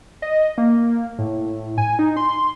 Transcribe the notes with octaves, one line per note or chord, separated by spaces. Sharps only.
D#5
A#3
A2
G#5
D#4
C6